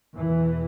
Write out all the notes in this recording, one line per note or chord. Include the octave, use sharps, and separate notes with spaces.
E2 B2 E3